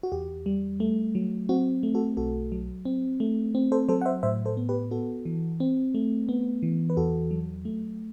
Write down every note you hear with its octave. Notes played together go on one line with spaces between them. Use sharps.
F#4
E2 G4
G3
A3
F#3
C4 F#4
A3
F#4 A4
B1 F#4 A4
F#3
C4
A3
C4
A4 C5
F#3 A4 C5
F#5
C5 E5
A2 C5 E5
A4 C5
B3
G4 B4
B3 F#4 A4
E3
C4
A3
B3
E3
B4
E2 F#4 A4
F#3
A3